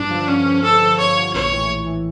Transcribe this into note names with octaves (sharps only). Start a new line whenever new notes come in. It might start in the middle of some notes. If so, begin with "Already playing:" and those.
Already playing: G2 D4
D3 F3
G2 C#4
D3 F3
G2 A4
D3 F3
G2 C#5
D3 F3
A#1 C#5
A2 E3
A#1
A2 E3